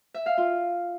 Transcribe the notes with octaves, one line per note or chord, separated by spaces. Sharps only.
E5
F5
F4